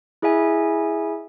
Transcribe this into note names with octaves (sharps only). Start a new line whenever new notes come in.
E4 G#4 D#5 E5 G#5